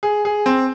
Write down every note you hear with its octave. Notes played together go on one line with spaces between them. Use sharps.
G#4
G#4
C4